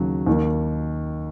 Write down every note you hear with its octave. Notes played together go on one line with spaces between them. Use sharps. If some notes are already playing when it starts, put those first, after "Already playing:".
Already playing: D#2 C#3 F#3
D#2 D#3 A#3